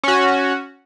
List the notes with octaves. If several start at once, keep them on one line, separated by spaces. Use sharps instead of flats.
C#4 F#4